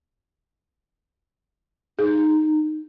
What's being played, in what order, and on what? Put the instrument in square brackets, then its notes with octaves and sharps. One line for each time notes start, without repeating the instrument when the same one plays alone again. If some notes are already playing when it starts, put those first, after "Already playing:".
[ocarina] D#4 [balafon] G#4